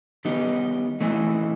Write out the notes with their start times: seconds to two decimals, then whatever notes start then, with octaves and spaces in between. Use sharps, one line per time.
0.25 D#3 G3 B3 D#4
1.01 E3 A3 C4 D#4